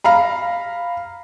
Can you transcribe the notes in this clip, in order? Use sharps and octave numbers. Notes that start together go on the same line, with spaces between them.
F5 A#5 B5